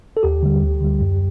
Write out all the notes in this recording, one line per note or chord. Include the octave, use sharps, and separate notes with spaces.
A4
D#2 G4
D3 G3
D2
D3 G3
F#2